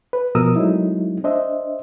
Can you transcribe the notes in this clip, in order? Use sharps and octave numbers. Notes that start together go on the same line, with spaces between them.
B4
B2 F3 A#4 D#6 E6
F#3 G#3 A3 C4 D#4 E4
D4 C5 D#5 E5